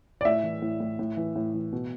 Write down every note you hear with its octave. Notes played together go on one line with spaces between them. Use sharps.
D5
A2 E5
E3
A2
A2
A2
E3
A2
E3
B2